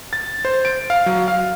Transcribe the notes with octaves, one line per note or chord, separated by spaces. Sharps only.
A6
C5
D7
F5
F#3
F5